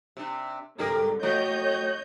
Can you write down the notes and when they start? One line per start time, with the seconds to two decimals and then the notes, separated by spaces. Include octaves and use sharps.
0.17 C3 D4
0.78 C2 G#2 D3 D4 G4 A#4
1.23 A3 F#4 G4 C#5 D#5 G6